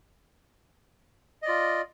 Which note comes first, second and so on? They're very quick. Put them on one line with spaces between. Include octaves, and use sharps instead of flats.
D#5 D5 F4